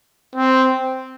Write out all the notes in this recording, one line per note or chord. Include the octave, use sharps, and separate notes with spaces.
C4